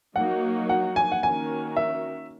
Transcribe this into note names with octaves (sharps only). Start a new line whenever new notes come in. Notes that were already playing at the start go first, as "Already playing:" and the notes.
F#3 A#3 D#4 F#4 F#5
F#5
G#5
F#5
D#3 A#3 C#4 F#4 A#4 G#5
E5